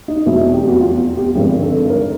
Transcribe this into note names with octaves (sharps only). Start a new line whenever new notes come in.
D#4
F1 E2 B2 F#3 E4
G4
F#4
F4
G4
G#1 G2 D3 F3 G#3 G4
A4
A#4